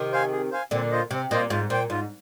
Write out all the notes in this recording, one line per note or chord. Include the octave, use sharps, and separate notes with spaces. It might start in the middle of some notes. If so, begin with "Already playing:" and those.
Already playing: C3 D#3
C5 F5 G#5
G#4
C5 F5 G#5
A#2 D3 C4
F4 C5 D#5
C3 C4
A#2 F4 C5 D#5
G#2 F4
A#2 C5 G5
G#2 F4